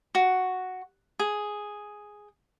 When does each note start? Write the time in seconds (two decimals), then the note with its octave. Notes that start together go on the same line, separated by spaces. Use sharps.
0.15 F#4
1.19 G#4